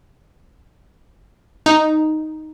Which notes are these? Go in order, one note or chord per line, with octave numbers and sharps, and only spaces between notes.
D#4